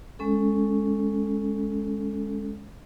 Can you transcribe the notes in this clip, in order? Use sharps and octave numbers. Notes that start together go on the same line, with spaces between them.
G#3 C#4 A4